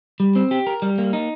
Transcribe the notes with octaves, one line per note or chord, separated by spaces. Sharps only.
G3
C4
G4
A#4
G3
A#3
D#4